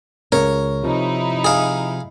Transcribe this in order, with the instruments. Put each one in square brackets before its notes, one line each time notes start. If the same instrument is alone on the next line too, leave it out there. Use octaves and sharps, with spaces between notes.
[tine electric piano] C#2 C#3 [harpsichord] A#4 [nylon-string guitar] C#5
[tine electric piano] C3 F3 [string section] D#4 E4
[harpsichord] G#4 F5